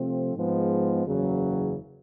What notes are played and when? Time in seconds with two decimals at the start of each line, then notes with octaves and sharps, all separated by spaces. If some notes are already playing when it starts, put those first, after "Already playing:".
Already playing: C3 F3 A3 C4
0.35 G#2 F3 G#3 B3
1.05 F#1 E2 C#3 F#3